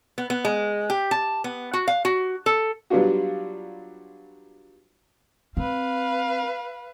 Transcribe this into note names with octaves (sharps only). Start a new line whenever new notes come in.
B3
B3
G#3
G4
A5
B3
F#4
F5
F#4
A4
F#3 G3 B3 D4 F4 F#4
C4 B4 F5